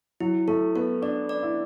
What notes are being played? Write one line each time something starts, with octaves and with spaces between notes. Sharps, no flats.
F#3 E4
A3 A4
B3 A4
D4 D5
D5
E4